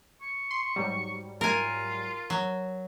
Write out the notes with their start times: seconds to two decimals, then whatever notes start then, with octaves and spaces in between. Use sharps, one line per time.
0.22 C#6
0.51 C6
0.76 G#2 F#3 G3
1.41 F4 A#4 G#5
2.30 F#3